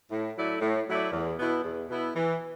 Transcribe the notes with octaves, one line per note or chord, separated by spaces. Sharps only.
A2
F#3 A3 E4 D5
A2
F#3 A3 E4 D5
E2
B2 B3 E4
E2
B2 B3 E4
E3